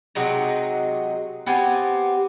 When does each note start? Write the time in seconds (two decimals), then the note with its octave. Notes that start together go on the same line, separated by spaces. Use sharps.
0.15 C3 F#3 G#3 D#4
1.46 B3 C4 G4 G#5